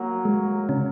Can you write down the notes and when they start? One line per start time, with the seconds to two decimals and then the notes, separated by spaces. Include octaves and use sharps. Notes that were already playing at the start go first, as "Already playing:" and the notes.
Already playing: F#3 A#3 F#4
0.25 G#3
0.69 C#3 C#4